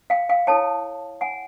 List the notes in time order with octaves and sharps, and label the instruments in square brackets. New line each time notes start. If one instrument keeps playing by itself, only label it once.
[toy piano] F5 G5
F5 G5
E4 A4 C#5 G5 A5
F#5 G#5